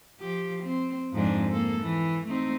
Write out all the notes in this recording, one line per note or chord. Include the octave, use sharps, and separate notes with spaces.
F3 G4
C4
F2 G#2 D4
A#3 A4
E3
A3 C4 D#4